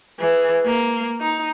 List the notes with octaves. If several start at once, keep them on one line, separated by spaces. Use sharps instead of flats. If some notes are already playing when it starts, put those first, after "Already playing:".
E3 G#4
A#3
D#4